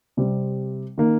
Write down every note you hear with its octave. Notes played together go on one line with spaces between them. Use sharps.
C3 G3 C4
D#3 A#3